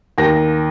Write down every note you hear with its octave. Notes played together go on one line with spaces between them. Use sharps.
D#2 A#6